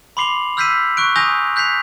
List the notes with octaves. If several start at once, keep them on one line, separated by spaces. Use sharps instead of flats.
B5 C6 D6 C7 F7 F#7
E6 F6 G6 B6 C7 D#7
C#6 F#6 D7
G#5 D#6 G6 A#6 F7 G7
F#6 G6 B6 C7 F7